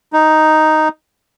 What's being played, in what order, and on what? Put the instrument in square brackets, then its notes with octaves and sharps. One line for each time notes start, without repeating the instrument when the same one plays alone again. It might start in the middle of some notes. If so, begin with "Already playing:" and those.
[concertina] D#4